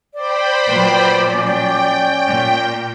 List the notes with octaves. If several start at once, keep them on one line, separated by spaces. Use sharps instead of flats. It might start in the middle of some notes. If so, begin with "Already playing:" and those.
C5 D5 G5 B5
A#2 F#3 B4
C#4 G5
A#2